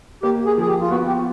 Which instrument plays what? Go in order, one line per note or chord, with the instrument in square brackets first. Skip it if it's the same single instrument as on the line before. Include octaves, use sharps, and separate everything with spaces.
[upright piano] A#3 [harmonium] G4
[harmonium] G#4
[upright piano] F3 [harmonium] G#4
[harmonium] G4
F4
[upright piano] B3 [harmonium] F#4
[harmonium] G4